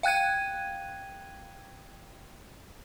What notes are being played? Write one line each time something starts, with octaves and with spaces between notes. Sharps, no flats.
F5 G5 F#6 G#6 D#7